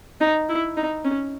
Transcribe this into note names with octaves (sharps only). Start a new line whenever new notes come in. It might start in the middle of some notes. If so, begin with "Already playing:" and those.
D#4
E4
D#4
C#4